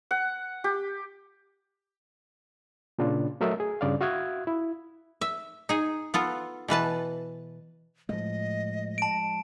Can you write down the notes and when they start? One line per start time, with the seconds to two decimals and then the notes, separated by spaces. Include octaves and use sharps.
0.11 F#5
0.64 G4
2.99 A#2 C#3 D4 F4
3.41 F#3 A3 A#4 D#5 E5
3.60 G#4
3.81 G2 C#3 D5 F5
4.01 F#4 E5 F5 D#6 F#6 G#6
4.47 E4
5.21 E5
5.69 D#4 G#4
6.14 B3 F4 A4
6.68 B2 E3 B4 A5
8.09 A2 F3 G#3 D#5
8.98 A5 D7